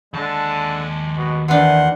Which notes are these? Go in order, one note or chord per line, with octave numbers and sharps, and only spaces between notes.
D#2 D3 G#3 A5
B2
C3 D#3 E3 D4 F#5 C6